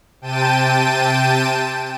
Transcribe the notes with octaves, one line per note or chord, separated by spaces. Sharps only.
C3 G5 A5 D#7